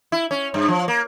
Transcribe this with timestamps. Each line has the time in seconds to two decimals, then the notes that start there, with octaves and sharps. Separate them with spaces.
0.12 E4
0.31 C#4
0.54 G2
0.68 F3
0.88 A#3